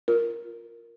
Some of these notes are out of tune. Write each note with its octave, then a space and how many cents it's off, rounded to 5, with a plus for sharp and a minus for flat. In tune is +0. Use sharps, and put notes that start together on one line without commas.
F4 +0 A#4 +0